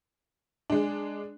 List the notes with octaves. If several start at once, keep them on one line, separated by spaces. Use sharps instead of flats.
G#3 D4